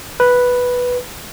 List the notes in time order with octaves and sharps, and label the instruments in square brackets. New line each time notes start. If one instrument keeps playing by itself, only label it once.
[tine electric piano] B4